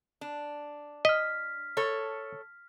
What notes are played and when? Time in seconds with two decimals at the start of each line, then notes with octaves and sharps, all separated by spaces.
0.21 D4
1.05 D#5 F6 B6
1.77 A4 C#5